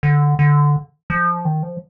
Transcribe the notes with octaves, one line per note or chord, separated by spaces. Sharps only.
D3
D3
F3
D#3
F3